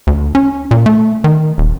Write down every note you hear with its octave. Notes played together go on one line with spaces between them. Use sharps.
D2
C#4
A#2
A3
D#3
D#1